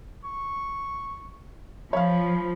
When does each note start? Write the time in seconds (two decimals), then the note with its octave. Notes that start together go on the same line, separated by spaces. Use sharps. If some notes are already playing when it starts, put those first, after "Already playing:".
0.24 C#6
1.93 F3 C#5 F5 B5